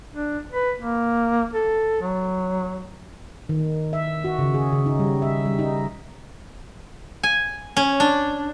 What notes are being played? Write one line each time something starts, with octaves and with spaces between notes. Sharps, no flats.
D4
B4
A#3
A4
F#3
D#3
E5
F#4
C#3
G#4
C#3
D#4
G3
E5
G3
D#4
G#5
C#4
D4